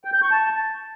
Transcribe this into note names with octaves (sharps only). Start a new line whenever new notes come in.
G5
G6
C#6
A5